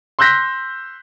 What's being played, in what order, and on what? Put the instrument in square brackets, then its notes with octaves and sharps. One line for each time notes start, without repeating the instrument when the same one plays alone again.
[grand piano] C6 E6 F#6 G6 A#6 B6